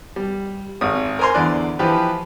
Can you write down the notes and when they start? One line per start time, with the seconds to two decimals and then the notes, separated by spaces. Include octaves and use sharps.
0.16 G3
0.81 G#1 D#6
1.19 A#4 C5 G#5 A#5 C6
1.34 E2 D3 D5 F#6
1.79 E3 F3 G4 B4